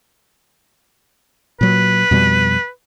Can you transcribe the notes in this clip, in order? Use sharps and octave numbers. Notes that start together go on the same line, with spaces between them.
A#2 F#3 B4
F2 B2 G3